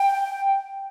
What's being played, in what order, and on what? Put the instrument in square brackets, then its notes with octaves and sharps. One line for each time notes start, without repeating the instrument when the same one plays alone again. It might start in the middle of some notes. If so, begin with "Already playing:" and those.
Already playing: [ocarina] G5